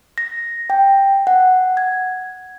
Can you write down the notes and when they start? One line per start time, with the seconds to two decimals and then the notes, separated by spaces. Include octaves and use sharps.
0.18 A#6
0.70 G5
1.27 F#5
1.77 G#6